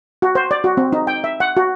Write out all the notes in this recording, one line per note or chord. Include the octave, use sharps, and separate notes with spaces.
F#4
C5
D5
F#4
C4
D#4
G5
E5
F#5
F#4